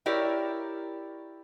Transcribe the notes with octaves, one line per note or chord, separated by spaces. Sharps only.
E4 G4 A#4 C#5 D5